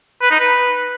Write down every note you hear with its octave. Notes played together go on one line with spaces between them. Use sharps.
B4
D#4
B4